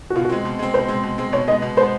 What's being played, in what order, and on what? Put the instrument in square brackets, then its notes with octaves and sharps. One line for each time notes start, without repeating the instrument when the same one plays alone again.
[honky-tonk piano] F#4
[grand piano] B2 [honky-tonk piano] F4
[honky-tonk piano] F#4
[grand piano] G#3 C4
B2
G#3 C4
[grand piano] B2 [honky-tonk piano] C5
[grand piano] G#3 C4
B2
G#3 C4
[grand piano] B2 [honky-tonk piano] C#5
[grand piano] G#3 [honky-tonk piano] D#5
[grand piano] B3
B2
[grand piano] G#3 B3 [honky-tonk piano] C5